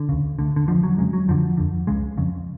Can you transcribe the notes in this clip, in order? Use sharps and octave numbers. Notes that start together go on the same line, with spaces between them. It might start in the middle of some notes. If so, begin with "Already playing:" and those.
Already playing: D3
D2 C#3
D2 D3
D3
F2 D3 F3
F#3
F2 C#3 G#3
F#3
F2 D3 F3
F2 D3
C#2 C#3 G#3
F2 C#3